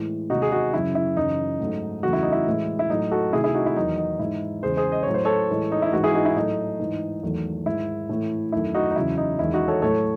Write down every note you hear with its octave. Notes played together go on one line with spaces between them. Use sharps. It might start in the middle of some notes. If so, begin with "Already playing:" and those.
Already playing: A2 E3 G#3
C3 D#3 G#3 D#4 F#4
G#4
D#4 F#4
F#2 C#3 F#3 E4
E4
F#2 C#3 E3 D#4
G#2 F#3 A3
E2 C#3 F#3 A3 F#4
E4
D#4
E4
A2 E3 G#3
E4
A2 F#3 A3 D#4
F#4 A4
C3 D#3 A3 E4 G#4
E4 G#4
D#4 F#4
E4
E2 D#3 F#3 D#4
D#4
G#2 E3 G#3 E4
E2 C#3 G#3 G#4 C5
G#4 C5
D#5
A2 F#3 A3 C#5
C5
A4 C#5
A2 E3 G#3
D#4
E4
G#2 E3 G#3 F#4
E4 G#4
D#4 F#4
E4
A2 F#3 A3 D#4
G#2 E3 G#3
E2 D#3 F#3 A3
G#2 D#3 G#3 E4
A2 E3 A3
F#2 D#3 A3 E4
D#4 F#4
D#4
E2 C#3 F#3 E4
D#4
E2 D#3 G#3 E4
D#4 F#4
A4 C#5
A2 F#3 A3 A4 C#5